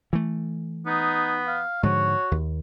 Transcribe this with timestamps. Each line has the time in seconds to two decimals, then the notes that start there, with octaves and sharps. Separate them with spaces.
0.13 E3 A3
0.86 B3 D#4
1.47 F5
1.83 G#2 D3 F3 F#4 C#5
2.31 D#2